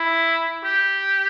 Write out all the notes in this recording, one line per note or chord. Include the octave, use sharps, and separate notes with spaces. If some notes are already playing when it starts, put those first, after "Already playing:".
Already playing: E4
G4